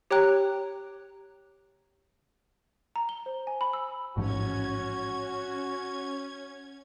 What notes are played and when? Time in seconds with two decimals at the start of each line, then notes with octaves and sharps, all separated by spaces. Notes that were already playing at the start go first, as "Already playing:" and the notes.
0.11 G4 C#5 G5 A#5 F#6
2.96 A#5
3.09 G7
3.26 C5
3.47 G#5
3.61 B5
3.73 E6
4.17 A1 G#2 F3 C#4 F#4 G#6